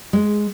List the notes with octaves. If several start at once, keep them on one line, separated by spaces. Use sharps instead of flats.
G#3